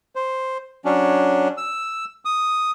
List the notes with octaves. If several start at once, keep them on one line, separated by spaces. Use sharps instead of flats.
C5
F#3 C#4 D4
E6
D#6